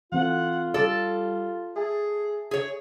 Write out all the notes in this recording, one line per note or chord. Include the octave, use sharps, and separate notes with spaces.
E3 C4 F4 A4 F#5
G3 G4 A4 D5
G#4 E5 G#5 A5
G#4 C#5